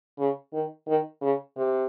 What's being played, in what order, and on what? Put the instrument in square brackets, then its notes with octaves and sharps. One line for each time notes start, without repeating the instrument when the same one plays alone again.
[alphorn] C#3
D#3
D#3
C#3
C3